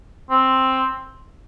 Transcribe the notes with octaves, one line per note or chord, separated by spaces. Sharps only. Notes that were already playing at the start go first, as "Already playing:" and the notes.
C4